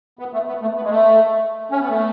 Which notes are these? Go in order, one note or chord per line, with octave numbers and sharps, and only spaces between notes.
B3
A3
B3
A3
B3
G#3
A3
C#4
B3
A3